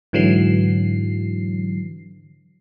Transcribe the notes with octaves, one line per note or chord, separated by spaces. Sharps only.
G#2 D3 E3 F#3 C7